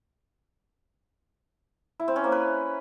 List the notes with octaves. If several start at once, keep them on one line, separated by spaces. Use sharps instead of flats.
E4
C4
C#4
A#3
B4